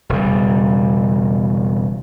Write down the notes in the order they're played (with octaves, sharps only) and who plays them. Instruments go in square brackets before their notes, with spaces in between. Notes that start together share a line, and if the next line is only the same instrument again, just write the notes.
[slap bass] E1 C#3 G3